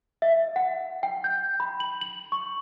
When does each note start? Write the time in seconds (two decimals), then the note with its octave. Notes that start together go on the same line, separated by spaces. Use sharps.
0.22 E5
0.56 F#5
1.03 G5
1.24 G6
1.60 B5
1.80 F#7
2.01 F#7
2.32 C#6